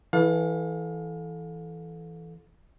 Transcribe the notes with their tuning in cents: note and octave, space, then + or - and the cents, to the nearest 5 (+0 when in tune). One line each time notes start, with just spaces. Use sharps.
E3 +0 A4 -15 F5 +35